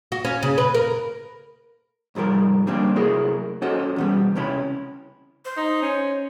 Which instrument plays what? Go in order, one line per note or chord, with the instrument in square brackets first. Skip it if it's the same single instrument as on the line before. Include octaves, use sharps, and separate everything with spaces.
[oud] F#4
C#4
C#3
B4
A#4
[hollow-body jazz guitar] C2 G#2 F3 G3 A#4
D3 G3 A#3 C4 D4
C3 F#3 A3 E4 G#4 A#4
C#4 F#4 A4 C5 D#5
E2 B2 G3
C#2 C3 C#4 E4 B5
[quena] C5
[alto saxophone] D#4
C#4